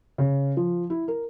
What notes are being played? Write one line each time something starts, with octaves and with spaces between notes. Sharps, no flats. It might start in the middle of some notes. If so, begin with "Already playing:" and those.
C#3
F3
E4
A#4